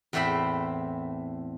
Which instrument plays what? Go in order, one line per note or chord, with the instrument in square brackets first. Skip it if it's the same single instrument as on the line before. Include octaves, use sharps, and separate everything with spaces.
[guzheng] E2 A2 A3 C4 E5 B5